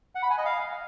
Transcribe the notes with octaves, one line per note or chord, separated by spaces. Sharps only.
F#5
B5
G#5
D#5
F5